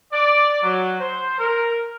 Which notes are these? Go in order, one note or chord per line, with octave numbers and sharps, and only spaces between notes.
D5
F#3
C5
A#4